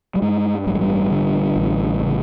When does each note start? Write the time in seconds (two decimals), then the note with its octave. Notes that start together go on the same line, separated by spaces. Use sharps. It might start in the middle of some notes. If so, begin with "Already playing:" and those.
0.16 G3
0.22 G2 G#3
0.66 A1 G3
0.74 G#3
0.81 G3
1.11 D3
1.56 A1
2.02 C#3